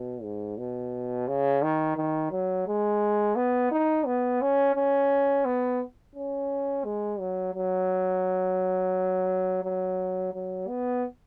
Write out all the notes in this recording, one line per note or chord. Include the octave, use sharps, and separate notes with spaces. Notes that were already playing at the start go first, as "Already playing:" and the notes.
Already playing: B2
G#2
B2
C#3
D#3
D#3
F#3
G#3
B3
D#4
B3
C#4
C#4
B3
C#4
G#3
F#3
F#3
F#3
F#3
B3